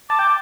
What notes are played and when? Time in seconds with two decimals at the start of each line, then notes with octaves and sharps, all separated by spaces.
0.10 A5 D6
0.19 G5